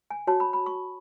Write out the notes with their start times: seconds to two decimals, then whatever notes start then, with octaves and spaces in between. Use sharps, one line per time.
0.10 G#5
0.27 F#4 C#5 A5
0.40 B5
0.53 B5
0.66 C#6